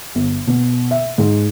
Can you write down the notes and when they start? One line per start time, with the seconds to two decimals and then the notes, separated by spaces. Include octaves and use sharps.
0.15 G1
0.47 B2
0.91 E5
1.18 G#2